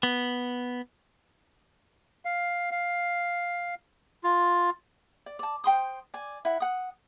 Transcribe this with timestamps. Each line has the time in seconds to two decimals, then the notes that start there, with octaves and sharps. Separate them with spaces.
0.03 B3
2.25 F5
2.72 F5
4.24 F4
5.26 D5
5.39 D5 A5
5.64 C5 G5 C6 D#6
6.14 D5 G#5
6.45 E4 F#5
6.60 F#5 D#6